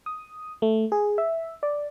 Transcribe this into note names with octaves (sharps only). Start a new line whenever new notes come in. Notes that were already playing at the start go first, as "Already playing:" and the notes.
D#6
A3
G#4
E5
D5